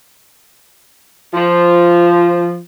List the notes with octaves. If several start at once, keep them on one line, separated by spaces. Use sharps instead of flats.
F3